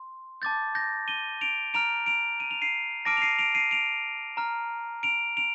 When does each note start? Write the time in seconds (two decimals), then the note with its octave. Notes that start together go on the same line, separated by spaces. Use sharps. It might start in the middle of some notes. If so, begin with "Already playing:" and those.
Already playing: C6
0.42 A5 D6 G6 A6
0.75 G6 A#6
1.08 D#7 G7
1.41 D7 F7
1.74 A#5 F6 D7 F7
2.06 D7 F7
2.40 D#7
2.51 F7
2.62 C7 D#7
3.05 A5 D6 F6 A#6 D7
3.17 F7
3.22 C7 D#7
3.39 D7 F7
3.55 C7 D#7
3.71 D7 F7
4.37 A#5 F6
5.03 D7 F7
5.37 D7 F7